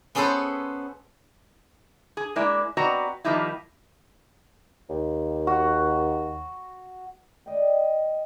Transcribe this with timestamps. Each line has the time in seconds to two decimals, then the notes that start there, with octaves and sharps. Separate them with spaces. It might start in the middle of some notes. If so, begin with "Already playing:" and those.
0.15 B3 C#4 G#4 A4 B4 C5
2.17 G#4
2.36 G#3 A#3 E4 D5
2.77 B3 C4 F#4 D5 D#5 A#5
3.25 D#3 F3 G3 A#3 D#4 E4
4.90 D#2
5.47 F#4
7.46 D5 D#5 G5